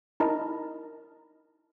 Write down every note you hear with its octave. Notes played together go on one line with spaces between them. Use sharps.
D#4 E4 A#4 D#5 A5